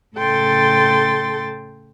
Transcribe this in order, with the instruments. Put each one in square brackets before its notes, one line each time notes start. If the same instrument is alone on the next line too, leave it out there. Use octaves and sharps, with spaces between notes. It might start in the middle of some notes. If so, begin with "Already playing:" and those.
[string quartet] A2 C#3 A4 G5 C6 A6